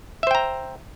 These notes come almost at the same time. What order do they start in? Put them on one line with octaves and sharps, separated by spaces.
E5 C5 G5 A#5